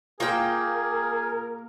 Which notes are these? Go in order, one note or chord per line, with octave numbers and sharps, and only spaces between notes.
A#3 F4 G#4 A#4 G5